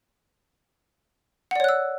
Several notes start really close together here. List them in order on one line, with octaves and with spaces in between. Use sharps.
F#5 D5 C#5 F#6 E6